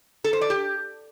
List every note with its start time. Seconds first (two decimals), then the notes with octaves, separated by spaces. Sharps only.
0.24 A4
0.33 C5
0.41 D5
0.50 G4